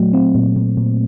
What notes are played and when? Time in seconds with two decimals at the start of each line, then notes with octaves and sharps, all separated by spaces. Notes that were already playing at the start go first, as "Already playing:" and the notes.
Already playing: A#2 F#3 A3
0.13 C4
0.35 A#2
0.56 A#2
0.77 A#2